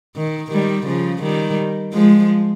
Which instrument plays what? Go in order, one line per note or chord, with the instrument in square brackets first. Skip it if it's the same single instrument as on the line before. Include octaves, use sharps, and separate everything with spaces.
[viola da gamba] D#3
D#3 G3
C#3 F3
D#3 G3
F3 G#3